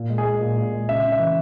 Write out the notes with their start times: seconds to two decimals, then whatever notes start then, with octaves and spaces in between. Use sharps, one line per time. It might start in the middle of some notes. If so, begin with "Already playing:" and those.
Already playing: A#2
0.09 G#3
0.18 G#4
0.26 G#3
0.41 A#2
0.57 A#2
0.72 G#3
0.89 C#3 E5
1.04 C#3
1.12 E5
1.19 E3